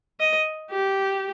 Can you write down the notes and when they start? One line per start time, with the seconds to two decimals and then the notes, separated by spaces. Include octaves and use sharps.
0.20 D#5
0.71 G4